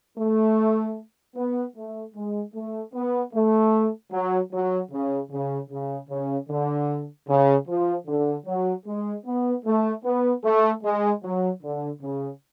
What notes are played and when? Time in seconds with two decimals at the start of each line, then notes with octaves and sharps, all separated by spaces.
0.18 A3
1.37 B3
1.76 A3
2.15 G#3
2.54 A3
2.94 B3
3.34 A3
4.12 F#3
4.52 F#3
4.92 C#3
5.31 C#3
5.70 C#3
6.10 C#3
6.49 D3
7.28 C#3
7.68 F3
8.07 D3
8.47 F#3
8.86 G#3
9.26 B3
9.65 A3
10.05 B3
10.44 A3
10.84 G#3
11.23 F#3
11.63 D3
12.02 C#3